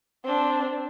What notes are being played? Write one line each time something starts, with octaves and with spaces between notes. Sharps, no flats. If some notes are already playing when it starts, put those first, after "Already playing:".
C4 D4